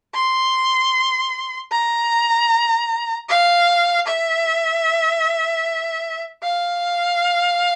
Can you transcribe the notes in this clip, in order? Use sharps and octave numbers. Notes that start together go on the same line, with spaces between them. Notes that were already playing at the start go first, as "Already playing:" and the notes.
C6
A#5
F5
E5
F5